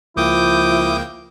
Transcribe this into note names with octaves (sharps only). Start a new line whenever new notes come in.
C#2 F3 A#3 E4 G5 D6 D#6 G6